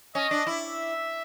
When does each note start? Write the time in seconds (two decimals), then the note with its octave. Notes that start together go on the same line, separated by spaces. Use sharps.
0.15 C#4 D#5
0.31 D4
0.47 E4
0.63 E5